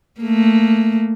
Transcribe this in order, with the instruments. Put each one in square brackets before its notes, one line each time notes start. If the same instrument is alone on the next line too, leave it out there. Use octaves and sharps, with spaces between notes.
[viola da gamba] A3 A#3